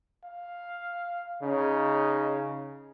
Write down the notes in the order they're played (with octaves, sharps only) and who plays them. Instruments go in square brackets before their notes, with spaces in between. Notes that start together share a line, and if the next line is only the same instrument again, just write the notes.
[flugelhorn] F5
[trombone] C#3 [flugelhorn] D#4